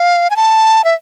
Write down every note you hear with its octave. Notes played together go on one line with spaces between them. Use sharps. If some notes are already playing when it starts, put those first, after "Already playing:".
Already playing: F5
G#5
A5
E5